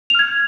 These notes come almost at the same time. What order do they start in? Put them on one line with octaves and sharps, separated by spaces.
F7 F6 G#6